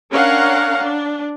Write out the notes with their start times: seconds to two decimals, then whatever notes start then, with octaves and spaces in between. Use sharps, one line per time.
0.11 C#4 D4 A#4 F5 F#5 A#5
0.80 D4